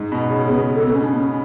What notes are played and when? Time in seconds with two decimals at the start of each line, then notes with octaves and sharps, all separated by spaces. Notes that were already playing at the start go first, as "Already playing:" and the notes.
Already playing: G#2
0.12 B2
0.30 C#3
0.48 C#3 B3
0.75 A4
0.86 B3
0.94 C#4
1.01 D4
1.14 B3
1.19 C#4